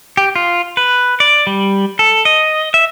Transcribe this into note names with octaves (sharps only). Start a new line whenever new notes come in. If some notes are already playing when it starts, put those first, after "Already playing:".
G4
F4
B4
D5
G3
A4
D#5
E5